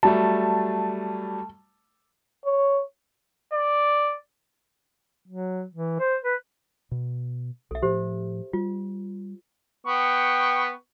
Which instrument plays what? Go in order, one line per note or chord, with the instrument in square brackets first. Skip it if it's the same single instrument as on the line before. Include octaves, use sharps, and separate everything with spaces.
[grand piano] F#3 G3 A3 [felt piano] A5
[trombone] C#5
[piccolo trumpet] D5
[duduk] F#3
E3
C5
B4
[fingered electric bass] B2
[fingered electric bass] B1 [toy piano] A4 E5
[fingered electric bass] A2 F3 [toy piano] G4 C5
[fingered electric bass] G3 [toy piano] F4
[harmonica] B3 G5 C#6